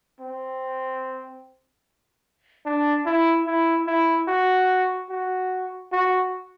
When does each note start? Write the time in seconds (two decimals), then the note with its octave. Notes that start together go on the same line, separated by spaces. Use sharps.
0.20 C4
2.66 D4
3.06 E4
3.47 E4
3.87 E4
4.28 F#4
5.10 F#4
5.92 F#4